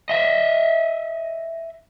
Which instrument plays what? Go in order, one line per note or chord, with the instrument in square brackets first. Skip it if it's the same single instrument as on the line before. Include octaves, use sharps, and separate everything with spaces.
[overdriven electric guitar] D#5 E5